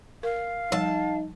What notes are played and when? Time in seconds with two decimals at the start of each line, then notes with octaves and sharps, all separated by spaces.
0.23 A#4 F5
0.72 F3 G3 D#4 A5